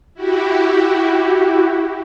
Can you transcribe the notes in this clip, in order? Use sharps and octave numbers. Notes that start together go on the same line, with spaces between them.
E4 F#4 G4